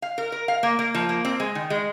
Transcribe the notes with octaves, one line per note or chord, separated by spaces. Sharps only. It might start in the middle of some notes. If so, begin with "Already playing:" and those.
F5
A#4
A#4
F5
A#3
A#3
F3
A#3
C4
G#3
D#3
G#3